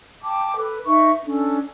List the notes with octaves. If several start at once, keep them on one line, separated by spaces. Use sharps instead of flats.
G5 A5 D6
A4 B4
D#4 B4 E5 C#6
C#4 D4 A4